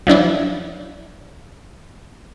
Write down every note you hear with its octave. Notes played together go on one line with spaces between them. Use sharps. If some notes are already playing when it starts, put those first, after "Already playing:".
F3 F#3 D4 E4